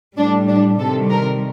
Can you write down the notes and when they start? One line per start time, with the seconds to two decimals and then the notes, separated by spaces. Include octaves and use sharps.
0.17 A2 G3 D4
0.48 D4
0.79 C3 D#3 G3 A4
1.11 A#4